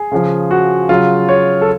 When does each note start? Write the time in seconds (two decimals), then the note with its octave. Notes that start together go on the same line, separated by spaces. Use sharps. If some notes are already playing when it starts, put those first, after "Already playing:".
Already playing: G#4
0.12 C#3 F3
0.51 F#4
0.89 C#3 F#3 F4
1.29 C#5
1.61 A4